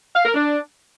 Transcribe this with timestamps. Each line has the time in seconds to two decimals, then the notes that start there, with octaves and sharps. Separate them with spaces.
0.16 F5
0.25 A#4
0.35 D4